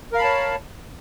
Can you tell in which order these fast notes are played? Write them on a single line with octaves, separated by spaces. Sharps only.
A#4 F5 B5 A5 C#5